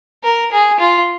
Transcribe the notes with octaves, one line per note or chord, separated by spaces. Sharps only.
A#4
G#4
F4